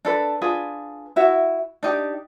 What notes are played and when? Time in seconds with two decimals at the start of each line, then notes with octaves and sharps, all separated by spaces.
0.05 D4 A4 B4
0.41 D4 F4 G#4 B4
1.16 E4 F#4 E5
1.83 D4 D#4 G4